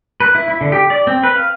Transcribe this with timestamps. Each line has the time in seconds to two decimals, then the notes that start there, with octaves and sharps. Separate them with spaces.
0.20 B4
0.35 E4
0.48 E4
0.61 D3
0.72 G4
0.90 D5
1.07 C4
1.24 B4
1.36 F5